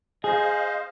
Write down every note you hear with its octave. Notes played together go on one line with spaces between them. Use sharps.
G#4 C5 D#5 F5